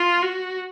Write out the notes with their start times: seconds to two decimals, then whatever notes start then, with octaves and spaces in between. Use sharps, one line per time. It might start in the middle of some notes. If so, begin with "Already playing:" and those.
Already playing: F4
0.23 F#4